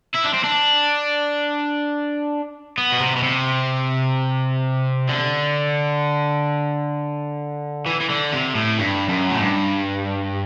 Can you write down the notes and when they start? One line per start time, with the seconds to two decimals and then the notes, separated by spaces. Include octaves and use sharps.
0.15 E4
0.25 D4
0.34 C4
0.44 D4
2.78 B3
2.92 B2
3.00 C3
3.16 B2
3.23 C3
5.09 D3
7.86 E3
8.00 E3
8.09 D3
8.32 C3
8.55 A2
8.79 G2
9.09 F#2
9.31 A2
9.40 G2